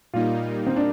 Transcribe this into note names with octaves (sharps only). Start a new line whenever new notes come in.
A#2 G3 A#3 D#4 F4
C4
D4